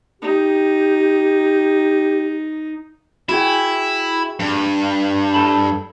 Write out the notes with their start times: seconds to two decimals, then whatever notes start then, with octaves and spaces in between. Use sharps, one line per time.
0.22 D#4 G4
3.29 E4 F#4 G#4 G5
4.40 G2
5.34 A4 A5 B5